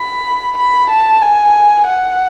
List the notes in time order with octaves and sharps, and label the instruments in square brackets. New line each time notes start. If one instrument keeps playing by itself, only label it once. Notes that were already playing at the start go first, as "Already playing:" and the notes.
Already playing: [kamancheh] B5
B5
A5
G#5
F#5